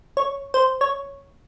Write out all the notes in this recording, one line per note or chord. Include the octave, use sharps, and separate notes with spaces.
C#5
C5
C#5